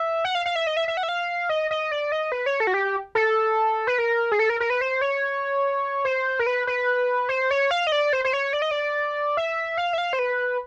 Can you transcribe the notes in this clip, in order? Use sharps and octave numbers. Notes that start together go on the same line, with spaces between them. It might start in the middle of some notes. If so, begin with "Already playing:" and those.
Already playing: E5
F#5
F5
F5
E5
D#5
E5
E5
F#5
E5
F5
D#5
D#5
D5
D#5
B4
C#5
A4
F#4
G4
A4
B4
A#4
G#4
A4
A#4
A#4
B4
C5
C#5
C5
A#4
B4
B4
C5
C#5
F5
D#5
D5
C5
C5
C#5
D5
D#5
D5
E5
F5
E5
F5
C5
B4